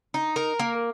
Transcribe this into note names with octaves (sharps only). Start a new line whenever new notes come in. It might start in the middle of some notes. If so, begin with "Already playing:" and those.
D#4
A#4
A#3